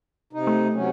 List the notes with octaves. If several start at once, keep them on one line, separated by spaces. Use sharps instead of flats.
C3 D#4
A3
C3 F#3 C#4